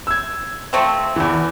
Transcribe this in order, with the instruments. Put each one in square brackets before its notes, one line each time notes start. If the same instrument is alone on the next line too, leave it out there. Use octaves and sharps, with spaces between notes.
[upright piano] E6 G#6
[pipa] F3 A3 C4
[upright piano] E2 E3